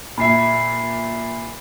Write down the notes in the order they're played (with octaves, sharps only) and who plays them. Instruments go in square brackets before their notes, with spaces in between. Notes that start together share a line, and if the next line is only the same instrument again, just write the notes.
[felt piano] A#2 E5 [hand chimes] B5 C7